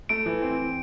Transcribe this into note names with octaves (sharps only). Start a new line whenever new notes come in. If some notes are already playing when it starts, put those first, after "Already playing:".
A3 D7
E3
C4